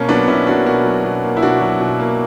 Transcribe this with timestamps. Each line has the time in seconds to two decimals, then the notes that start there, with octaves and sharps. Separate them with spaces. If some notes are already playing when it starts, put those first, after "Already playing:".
Already playing: B2 A#3 C#4
0.09 F#3 B3 D4
0.28 B2 C#4 E4
0.47 A#3 D4 F#4
0.66 B2 F#4 A#4
0.85 F#3
1.04 B2
1.24 A#3
1.37 E4
1.42 B2 D4 F#4
1.61 F#3
1.81 B2
2.00 A#3